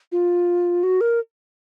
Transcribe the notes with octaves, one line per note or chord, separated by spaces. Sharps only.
F4
F#4
A#4